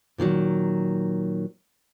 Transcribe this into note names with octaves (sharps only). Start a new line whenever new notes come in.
A#2 D#3 F3 F#3